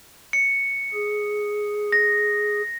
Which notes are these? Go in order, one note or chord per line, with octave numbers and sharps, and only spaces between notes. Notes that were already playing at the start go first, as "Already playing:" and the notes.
C#7
G#4
A#6